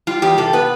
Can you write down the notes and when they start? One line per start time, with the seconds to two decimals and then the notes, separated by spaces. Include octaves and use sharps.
0.07 G3 F4
0.22 E2 G4
0.38 C3 A4
0.53 B3 B4